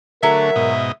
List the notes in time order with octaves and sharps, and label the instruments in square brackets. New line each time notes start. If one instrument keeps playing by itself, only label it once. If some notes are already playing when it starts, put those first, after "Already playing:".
[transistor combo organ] D3 A3 [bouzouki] F#3 C#5 [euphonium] A#4 [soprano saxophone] E5
[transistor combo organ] G#2 B2 D#5